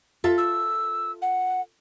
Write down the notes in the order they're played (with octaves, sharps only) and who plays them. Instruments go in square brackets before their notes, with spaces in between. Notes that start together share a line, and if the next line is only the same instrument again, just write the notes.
[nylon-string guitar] F4 A4 E5
[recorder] E6
F#5